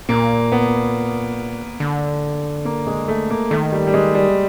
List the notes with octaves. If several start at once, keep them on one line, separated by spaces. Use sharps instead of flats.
A#2 A#3
B3
D3
A#3
G#3
A3
A#3
D#3 A3
G3
G3
G#3
G3